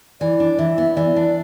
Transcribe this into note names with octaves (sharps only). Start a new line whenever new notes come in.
E3 D5
D4
E3 E5
B3
E3 D5
D4